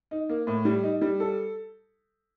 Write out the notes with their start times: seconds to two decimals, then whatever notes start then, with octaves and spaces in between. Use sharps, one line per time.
0.11 D#4
0.29 A#3
0.47 A2
0.65 G3
0.83 D#4
1.01 G3
1.20 A4